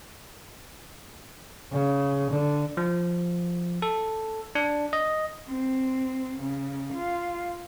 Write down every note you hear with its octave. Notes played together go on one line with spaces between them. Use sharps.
C#3
D3
F3
A4
D4
D#5
C4
C#3
F4